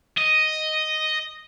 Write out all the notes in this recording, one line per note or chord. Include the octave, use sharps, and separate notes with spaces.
D#5